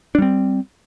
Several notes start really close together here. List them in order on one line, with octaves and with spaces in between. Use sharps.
D4 G3 C4